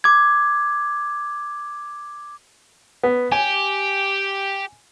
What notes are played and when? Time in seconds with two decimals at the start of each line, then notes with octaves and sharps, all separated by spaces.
0.04 D6 G#6
3.03 B3
3.32 G4 G#5